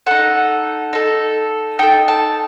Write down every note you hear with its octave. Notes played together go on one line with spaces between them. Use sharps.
D#4 A4 F#5
D#4 A4
D#4 A4 G5
A5